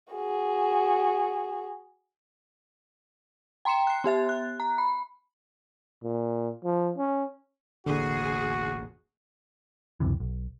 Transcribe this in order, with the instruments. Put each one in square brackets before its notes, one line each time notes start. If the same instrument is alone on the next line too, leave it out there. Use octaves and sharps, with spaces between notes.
[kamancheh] F#4 G#4
[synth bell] G5 A#5 C6 C#7 E7
F#6 C7
B3 G4 E5 A6
F#6
A#5
B5
[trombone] A#2
F3
C#4
[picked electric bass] E1 A1 A#3 [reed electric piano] D3 [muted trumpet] F#4 [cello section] G#4
[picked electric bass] C#2 F#2 C3 E3
B1